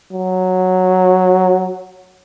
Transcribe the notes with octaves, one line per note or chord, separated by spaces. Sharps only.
F#3